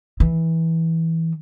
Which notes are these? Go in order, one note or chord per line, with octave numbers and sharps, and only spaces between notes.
E3